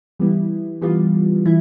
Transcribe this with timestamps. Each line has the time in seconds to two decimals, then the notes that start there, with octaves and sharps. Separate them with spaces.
0.19 E3 G3 B3 E4
0.81 E3 G3 B3 F4
1.46 E3 E4